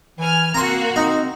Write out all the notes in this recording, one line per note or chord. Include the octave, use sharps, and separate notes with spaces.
E3 G#5 F6
A#3 C4 F#4 A#5 C6
C4 D#4